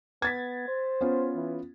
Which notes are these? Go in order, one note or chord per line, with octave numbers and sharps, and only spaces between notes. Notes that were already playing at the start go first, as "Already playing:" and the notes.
B3 G#6 A6 B6
C5
B3 C#4 F4
E3